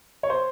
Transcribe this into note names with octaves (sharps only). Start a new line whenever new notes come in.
C#5
C5